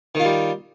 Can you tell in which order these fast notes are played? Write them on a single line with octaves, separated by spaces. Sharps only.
D#3 F4 G3